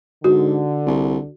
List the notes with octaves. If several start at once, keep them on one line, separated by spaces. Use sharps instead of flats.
G#2 D3 F#4
C2